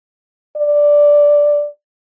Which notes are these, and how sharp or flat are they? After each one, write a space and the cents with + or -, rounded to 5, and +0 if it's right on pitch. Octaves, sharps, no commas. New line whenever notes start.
D5 -5